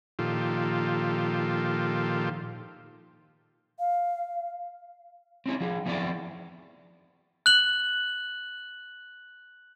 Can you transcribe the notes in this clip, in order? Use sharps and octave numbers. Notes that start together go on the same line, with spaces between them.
A#2 D#3 F3 F4 G4 A4
F5
C4 C#4 D#4 E4
F3 G#4
F3 B3 C4 E4 D5
F#6 F#7